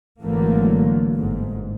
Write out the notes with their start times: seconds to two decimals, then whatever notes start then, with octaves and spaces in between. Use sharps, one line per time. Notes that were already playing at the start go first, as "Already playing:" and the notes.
0.22 G#1 D3 E3 F#3 A3 A#3
1.15 G1 G#2